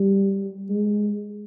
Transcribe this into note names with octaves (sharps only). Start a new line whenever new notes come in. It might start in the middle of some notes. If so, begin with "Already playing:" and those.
Already playing: G3
G#3